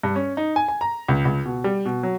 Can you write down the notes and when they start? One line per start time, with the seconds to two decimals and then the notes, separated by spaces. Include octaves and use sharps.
0.03 G2
0.16 C#4
0.37 D#4
0.56 G#5
0.68 G#5
0.81 A#5
1.08 C#2
1.25 C#2
1.45 B2
1.64 G3
1.85 B2
2.03 F#3